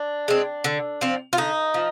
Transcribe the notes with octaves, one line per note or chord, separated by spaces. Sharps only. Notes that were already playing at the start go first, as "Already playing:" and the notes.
Already playing: D4
G#3 C4
D3
F3 C4
F4
D3 D#4
F3